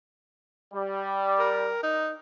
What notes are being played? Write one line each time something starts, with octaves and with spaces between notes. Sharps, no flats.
G3
A#4
D#4